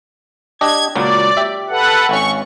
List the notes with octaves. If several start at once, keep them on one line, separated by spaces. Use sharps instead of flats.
D4 G4 D#5 G#6
C#2 A#2 F#3 D5
G4 E5
A4 B4 F#5
G#1 C#4 C#6